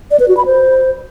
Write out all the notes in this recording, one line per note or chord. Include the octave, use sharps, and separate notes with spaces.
D5
B4
F#4
B5
C5